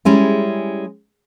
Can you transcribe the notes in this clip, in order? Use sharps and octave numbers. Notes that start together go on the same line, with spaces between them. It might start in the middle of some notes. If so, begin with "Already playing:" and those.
G3 G#3 C#4 E4